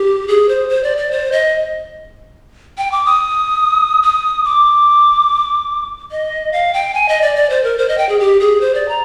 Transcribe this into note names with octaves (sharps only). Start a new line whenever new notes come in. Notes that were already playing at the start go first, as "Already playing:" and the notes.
Already playing: G4
G#4
C5
C5
D5
D5
C5
D#5
G5
D6
D#6
D#6
D6
D#5
F5
G5
G#5
D#5
D5
D5
C5
A#4
C5
D#5
G5
G#4
G4
G#4
C5
D5
A#5